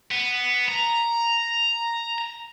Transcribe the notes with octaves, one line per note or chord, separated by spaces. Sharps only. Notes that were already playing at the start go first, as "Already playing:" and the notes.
B3
A#5